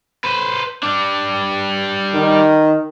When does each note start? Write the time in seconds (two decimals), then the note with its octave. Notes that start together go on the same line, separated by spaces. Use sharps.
0.24 B4 C5
0.83 G3 D4
2.14 D#3